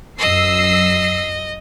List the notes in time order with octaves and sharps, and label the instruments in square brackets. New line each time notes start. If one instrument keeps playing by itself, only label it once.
[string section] F#2 E6 C7 [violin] D#5